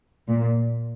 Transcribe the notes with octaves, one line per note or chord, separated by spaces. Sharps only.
A#2